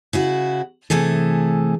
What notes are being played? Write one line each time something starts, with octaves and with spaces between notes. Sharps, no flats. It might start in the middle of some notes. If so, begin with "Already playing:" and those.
C#3 E4 F#4
C3 E3 A3 G#4 A4